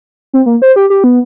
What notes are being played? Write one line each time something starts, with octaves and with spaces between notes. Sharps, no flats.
C4
A#3
C5
G4
G4
B3